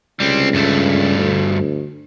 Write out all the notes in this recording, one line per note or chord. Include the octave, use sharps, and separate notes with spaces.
C#2 G3 C4
G2 A3
D2